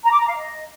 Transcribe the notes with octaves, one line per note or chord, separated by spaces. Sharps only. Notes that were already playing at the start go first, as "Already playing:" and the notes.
A#5
D6
A#5
F5
D#5